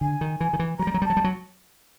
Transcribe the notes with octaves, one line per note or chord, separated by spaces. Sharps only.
D3 G#5
D#3
E3 G#5
D#3
E3
F#3 A#5
G3
F#3
G3
F#3 A5
G3
F#3